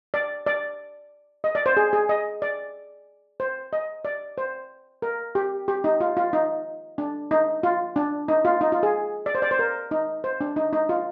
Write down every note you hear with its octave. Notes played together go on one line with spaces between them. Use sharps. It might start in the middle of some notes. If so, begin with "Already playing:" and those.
D5
D5
D#5
D5
C5
G#4
G#4
D#5
D5
C5
D#5
D5
C5
A#4
G4
G4
D#4
F4
F4
D#4
D4
D#4
F4
D4
D#4
F4
D#4
F4
G#4
D5
C5
D5
C5
A#4
D#4
C5
D4
D#4
D#4
F4